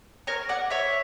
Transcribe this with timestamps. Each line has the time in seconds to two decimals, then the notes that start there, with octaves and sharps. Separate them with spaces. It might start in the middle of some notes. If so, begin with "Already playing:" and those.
0.27 A#4 C#5
0.49 D5 F#5
0.70 C#5 E5